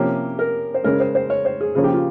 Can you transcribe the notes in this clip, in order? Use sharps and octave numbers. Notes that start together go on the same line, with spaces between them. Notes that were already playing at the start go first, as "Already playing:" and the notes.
Already playing: C3 F3 A#3 C#4 G4
A#4
C5
C#3 G#3 C#4 A#4
C5
C5
C#5
C5
G#4
C#3 F3 A#3 C#4 G#4
G4
F4